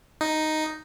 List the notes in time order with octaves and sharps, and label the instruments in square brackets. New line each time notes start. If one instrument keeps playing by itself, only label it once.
[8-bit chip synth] D#4